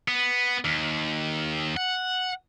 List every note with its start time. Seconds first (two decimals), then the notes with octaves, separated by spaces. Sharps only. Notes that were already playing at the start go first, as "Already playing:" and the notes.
0.08 B3
0.65 D#2
1.77 F#5